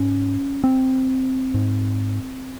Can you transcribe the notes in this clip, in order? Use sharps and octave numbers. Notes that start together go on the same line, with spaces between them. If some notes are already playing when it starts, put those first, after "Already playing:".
Already playing: G#2 C#4
C4
G#2